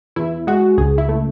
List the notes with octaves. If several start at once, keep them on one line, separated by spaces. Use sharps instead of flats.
E2 E4
G#3 F#4
C#2 G#4
E4
A3